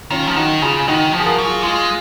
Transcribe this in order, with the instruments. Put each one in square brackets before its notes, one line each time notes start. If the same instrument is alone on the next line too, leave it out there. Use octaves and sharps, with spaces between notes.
[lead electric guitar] D#3 [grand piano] C#4 F4
[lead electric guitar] F3
[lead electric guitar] D#3 [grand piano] D#4 F#4
[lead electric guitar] C#3 [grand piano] F4 G#4
[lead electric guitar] D#3 [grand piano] D#4 F#4
[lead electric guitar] F3
[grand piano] G#4
F#4 A#4
[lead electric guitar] F#3
[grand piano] F4 G#4
[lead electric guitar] G#3 [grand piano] F4 G#4